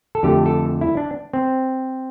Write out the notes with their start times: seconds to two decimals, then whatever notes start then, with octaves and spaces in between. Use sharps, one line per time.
0.15 A4
0.23 F2 D3 A3 G4
0.46 A4
0.81 E4
0.97 D4
1.33 C4